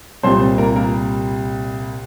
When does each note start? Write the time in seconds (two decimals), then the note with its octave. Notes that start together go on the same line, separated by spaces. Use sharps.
0.23 C2 A#2 G3 C4 C5
0.58 A#3 A#4
0.76 A#3 A#4